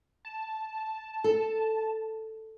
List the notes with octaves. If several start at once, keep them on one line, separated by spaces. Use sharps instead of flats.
A5
A4